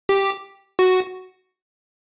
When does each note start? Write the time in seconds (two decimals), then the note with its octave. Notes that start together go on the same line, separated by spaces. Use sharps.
0.09 G4
0.79 F#4